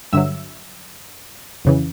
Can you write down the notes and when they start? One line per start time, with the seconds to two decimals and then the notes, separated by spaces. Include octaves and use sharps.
0.13 G2 D3 F#3 E5 E6
1.65 F2 C#3 E3